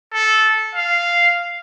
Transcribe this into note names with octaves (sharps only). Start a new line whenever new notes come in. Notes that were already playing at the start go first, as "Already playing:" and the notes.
A4
F5